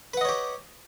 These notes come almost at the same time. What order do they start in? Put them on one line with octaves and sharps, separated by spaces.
B4 F#5 D#5 C#5 G4